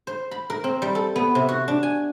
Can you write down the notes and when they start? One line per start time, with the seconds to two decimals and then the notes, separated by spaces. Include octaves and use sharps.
0.07 C5
0.31 B5
0.50 A#4
0.64 C4
0.82 G3
0.95 A4
1.16 B3
1.35 C3
1.49 F#4
1.68 D4
1.83 G#5